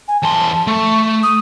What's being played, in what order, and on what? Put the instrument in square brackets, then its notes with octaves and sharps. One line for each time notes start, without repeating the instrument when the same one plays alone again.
[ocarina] G#5
[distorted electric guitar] E2 C6 [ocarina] A5
[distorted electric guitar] A3 [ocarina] C#6
[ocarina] D#6